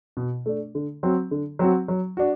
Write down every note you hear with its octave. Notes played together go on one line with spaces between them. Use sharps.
B2
A3 D4
D3
F#3 C4 F#4
D3
F#3 C4 F#4
F#3
D4 F#4